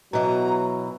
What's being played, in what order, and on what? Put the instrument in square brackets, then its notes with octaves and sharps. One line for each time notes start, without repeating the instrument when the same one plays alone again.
[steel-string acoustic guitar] B2 E3 [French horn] F#3 [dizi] A#5